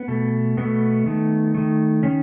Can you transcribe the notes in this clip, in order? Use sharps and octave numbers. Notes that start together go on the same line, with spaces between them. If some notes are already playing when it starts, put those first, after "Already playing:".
Already playing: B3
B2 A3
B2 A3 B3
D#3 A3
D#3 A3
D#3 C#4